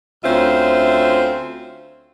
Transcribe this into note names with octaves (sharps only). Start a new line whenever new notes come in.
D2 C4 C#4 F4 C5 E5